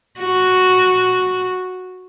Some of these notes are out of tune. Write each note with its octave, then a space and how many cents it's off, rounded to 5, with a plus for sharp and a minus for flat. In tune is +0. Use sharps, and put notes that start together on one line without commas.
F#4 -5